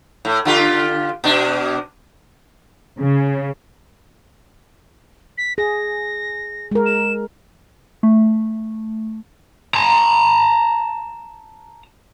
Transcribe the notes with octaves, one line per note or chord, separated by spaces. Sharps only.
A2
D3 F4 G4
B2 D4
C#3
B6
G#4 A#6
G#3 A#4
E7
A3
A5 A#5